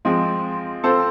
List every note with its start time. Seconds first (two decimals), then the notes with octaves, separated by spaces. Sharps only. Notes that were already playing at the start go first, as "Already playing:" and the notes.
0.05 F3 G#3 C4
0.84 C4 F4 A4 C5